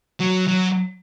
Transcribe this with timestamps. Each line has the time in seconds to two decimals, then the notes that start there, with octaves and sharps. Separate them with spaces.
0.20 F#3
0.48 F#3